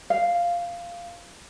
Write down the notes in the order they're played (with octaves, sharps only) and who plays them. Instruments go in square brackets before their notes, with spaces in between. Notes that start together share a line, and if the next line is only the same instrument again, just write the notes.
[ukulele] F5